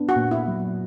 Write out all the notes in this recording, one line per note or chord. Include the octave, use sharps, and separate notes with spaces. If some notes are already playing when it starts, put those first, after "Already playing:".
Already playing: B3 D4
F#4
A#2
E4
F#3